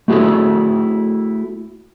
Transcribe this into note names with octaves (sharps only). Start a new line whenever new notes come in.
A3 E4 F#4 G#4 A4